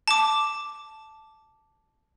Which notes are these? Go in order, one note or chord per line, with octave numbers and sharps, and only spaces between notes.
A5 D6